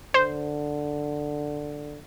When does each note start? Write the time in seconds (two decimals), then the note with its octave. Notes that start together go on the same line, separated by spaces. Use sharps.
0.14 D3 C5